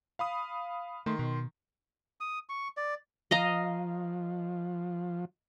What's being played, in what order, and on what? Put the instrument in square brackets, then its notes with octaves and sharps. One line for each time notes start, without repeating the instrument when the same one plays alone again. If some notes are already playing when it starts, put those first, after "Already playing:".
[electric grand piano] F5 B5 D#6
[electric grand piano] D#3 C6 [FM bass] A3
[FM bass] B2
[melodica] D#6
C#6
D5
[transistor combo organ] F3 [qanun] D#5 F5 A#5